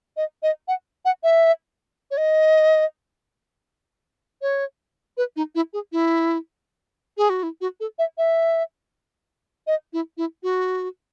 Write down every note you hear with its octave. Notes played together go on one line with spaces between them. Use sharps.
D#5
D#5
F#5
F#5
E5
C#5
D#5
C#5
B4
D#4
E4
G#4
E4
G#4
F#4
E4
F#4
A4
E5
E5
D#5
E4
E4
F#4